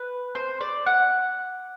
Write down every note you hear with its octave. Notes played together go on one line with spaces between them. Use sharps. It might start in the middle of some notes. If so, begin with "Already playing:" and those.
Already playing: B4
C5
D5
F#5